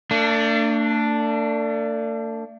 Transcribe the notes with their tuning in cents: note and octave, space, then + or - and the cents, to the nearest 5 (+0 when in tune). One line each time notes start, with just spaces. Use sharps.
A3 +45 D4 +0